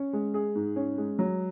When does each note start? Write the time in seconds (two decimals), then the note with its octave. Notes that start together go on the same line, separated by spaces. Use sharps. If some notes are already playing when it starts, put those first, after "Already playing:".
Already playing: C#4
0.13 G#3
0.34 G#4
0.55 G#2
0.76 C#4
0.98 G#3
1.19 F#3